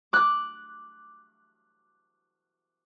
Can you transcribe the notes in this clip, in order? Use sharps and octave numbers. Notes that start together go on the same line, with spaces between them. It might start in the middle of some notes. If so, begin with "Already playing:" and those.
D6 F#6